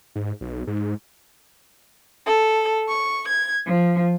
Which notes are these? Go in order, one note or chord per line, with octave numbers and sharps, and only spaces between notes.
G#2
B1
G#2
A4
C#6
G#6
F3